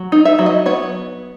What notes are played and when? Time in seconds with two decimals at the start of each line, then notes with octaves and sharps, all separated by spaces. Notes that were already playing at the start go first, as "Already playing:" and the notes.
Already playing: F#3
0.12 D#4
0.25 E5
0.39 F#3
0.46 D#5
0.66 B3 C#5